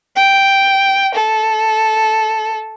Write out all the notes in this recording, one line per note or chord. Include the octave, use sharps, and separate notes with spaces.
G5
A4